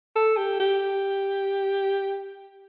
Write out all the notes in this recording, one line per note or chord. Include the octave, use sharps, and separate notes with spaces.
A4
G4
G4